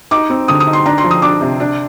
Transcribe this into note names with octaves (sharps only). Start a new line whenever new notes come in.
D#4 D6
C4
D3 D#6
D#6
D#4
C6
D4 A#5
C6
F3
D#6
D4 D6
C3
D4